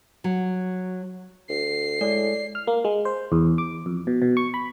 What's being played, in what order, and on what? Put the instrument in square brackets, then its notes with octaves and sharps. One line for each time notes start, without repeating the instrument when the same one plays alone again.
[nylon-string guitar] F#3
[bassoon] D2 [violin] C7
[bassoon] A2 [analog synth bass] G#3 [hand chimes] D5
[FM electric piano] F6
A#3
G#3
C5
E2
D6
F2
B2
B2
C#6
B5